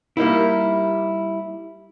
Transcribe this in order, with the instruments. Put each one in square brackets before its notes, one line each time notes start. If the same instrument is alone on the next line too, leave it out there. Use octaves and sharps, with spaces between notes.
[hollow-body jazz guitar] G3 A#3 D#4 E4